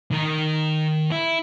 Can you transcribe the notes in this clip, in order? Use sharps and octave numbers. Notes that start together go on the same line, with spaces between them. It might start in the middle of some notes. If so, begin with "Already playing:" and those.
D#3 A#4
E4